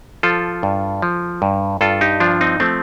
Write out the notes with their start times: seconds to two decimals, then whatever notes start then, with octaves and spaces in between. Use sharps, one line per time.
0.23 F3 F4 A4
0.63 G2
1.02 F3
1.42 G2
1.81 G2 F4 A4
2.01 D#4 G4
2.20 F3 D4 F4
2.41 C4 D#4
2.60 F3 A3 C4